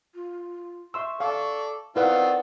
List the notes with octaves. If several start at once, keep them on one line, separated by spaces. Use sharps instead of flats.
F4
E5 C6 C#6 E6
A4 D5 F5
D#3 C4 E4 F4 B4 D5 F5 F#5